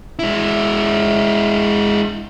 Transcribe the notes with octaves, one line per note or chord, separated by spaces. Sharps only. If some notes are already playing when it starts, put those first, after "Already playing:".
G#3 E4